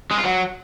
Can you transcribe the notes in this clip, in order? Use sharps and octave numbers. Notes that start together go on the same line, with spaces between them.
G#3
F4
F#3